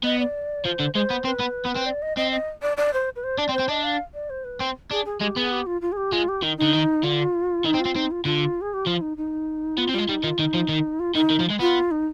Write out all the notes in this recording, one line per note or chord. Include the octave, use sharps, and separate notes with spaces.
B3 D#5
D5
F3 C5
D3
G#3 C5
B3
C4 B4
B3
B3
C4
D5
D#5
C4 D#5
D#5
D5
D5
C5
B4
C5
D4 D5
C4
C5
C4
D4 D#5
F5
D5
C5
B4
C4
D4 G#4
G#4
G#3 G4
B3 G#4
G4
F4
F4
G#4
G4
G#3 F4
G4
D#3 D#4
D3 D#4
D#3
D3 F4
D#3 D#4
C4
F4
C4
C4 D#4
F4
D3 F4
G#4
G4
F3 F4
D#4
D#4
B3 F4
C4
G3 F4
G#3
G3 D#4
D#3 F4
D#3 D#4
F3
D#3
F4
D#3 D#4
D#3
F3
G#3
B3 F4
D#4